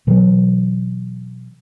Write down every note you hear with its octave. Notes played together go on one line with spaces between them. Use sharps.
B2 E3 F#3